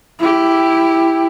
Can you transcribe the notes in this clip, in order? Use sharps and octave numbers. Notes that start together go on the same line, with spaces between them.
E4 G4